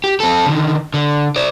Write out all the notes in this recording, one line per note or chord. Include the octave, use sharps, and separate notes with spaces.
G4
C4 A4
D3 D#3
D3
C5 D5